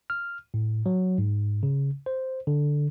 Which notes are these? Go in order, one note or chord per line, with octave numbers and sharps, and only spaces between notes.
F6
A2
F#3
G#2
C#3
C5
D3